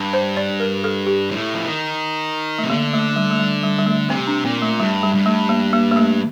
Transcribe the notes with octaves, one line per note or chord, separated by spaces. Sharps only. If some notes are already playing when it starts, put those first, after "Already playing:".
Already playing: G2
C5
D5
A#4
A4
G4
A2
F3
D#3
A3
C3
D3 A#3
A3
G3
A3
G3
G3
G3
A3
C3 C4
D4
A#2 C4
A3
G2 G3
G3
G2
A3
A#3
A#3
A#3
A3